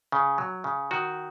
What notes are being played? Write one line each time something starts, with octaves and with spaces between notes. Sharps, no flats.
C#3
F#3
C#3
D#3 F#4